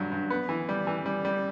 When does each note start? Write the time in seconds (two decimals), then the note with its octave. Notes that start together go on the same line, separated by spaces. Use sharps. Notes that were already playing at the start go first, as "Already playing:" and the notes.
Already playing: G2 F#3
0.11 G2
0.30 B3
0.49 E3
0.69 G3
0.87 E3
1.06 G3
1.25 G3